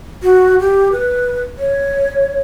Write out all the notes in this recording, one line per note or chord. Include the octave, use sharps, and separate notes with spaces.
F#4
G4
B4
C#5